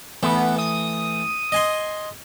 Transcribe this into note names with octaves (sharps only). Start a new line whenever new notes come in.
E3 A3 B3
D#6
D#5 G#5 C6